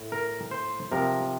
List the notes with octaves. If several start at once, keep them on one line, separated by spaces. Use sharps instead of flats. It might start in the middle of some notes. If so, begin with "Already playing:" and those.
Already playing: A2
A#4
C5
C3 F3 A#4